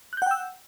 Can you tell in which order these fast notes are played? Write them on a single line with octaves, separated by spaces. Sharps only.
F#6 G6 F#5 G5 E6